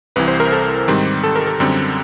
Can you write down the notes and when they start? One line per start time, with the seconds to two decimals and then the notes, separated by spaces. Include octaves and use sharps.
0.16 C2 C3 E3 B4
0.28 C5
0.40 A#4
0.52 A4
0.88 G#2 D#3 G3 C4
1.24 A4
1.36 A#4
1.47 A4
1.60 F#2 D3 G3 C4